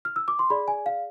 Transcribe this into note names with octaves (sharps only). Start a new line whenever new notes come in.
F6
E6
D6
C6
G#4 D5 B5
G#5
F5